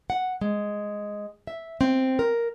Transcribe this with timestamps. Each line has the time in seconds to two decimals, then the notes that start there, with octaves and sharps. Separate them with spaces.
0.10 F#5
0.41 G#3
1.47 E5
1.81 C4
2.19 A#4